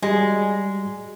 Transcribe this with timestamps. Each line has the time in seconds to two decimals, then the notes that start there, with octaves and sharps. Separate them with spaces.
0.02 G3 G#3 F#4 G#4